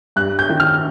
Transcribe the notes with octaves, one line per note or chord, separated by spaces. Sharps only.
G2 F#6
G6
D#3
F6